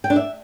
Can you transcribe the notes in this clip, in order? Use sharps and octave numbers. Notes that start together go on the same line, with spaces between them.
G5
D4
E5